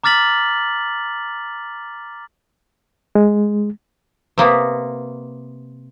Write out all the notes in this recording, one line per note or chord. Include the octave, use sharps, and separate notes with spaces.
A#5 D6 F6 A6 B6 F#7
G#3
C3 A#3 B3